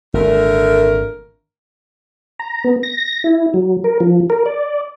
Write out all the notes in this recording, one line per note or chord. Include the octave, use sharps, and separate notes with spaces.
G#1 A#2 D3 A3 A#4
A#5
B3
A#6
E4
F#3
A#4
F3
A#4
D5